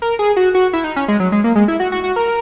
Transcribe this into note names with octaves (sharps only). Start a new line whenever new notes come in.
A#4
G#4
F#4
F#4
E4
D#4
C#4
G#3
F#3
G#3
A#3
G#3
E4
F#4
F#4
F#4
A#4